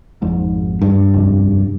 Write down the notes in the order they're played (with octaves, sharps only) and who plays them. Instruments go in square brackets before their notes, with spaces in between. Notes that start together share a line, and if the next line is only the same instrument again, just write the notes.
[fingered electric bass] G#1 F2 G#2
[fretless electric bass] G2
[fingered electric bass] F1 C2 F#2